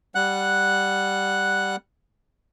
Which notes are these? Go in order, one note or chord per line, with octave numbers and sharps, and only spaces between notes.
G3 F#5 F#6